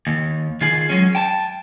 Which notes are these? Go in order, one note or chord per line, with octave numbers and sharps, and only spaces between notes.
D#2
D#3 F4 G#4
F#3 G#3 C#4
G5 A5